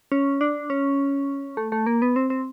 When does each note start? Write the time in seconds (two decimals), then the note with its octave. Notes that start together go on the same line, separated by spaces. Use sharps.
0.12 C#4
0.41 D4
0.70 C#4
1.57 A3
1.72 A3
1.86 A#3
2.02 B3
2.16 C4
2.30 C4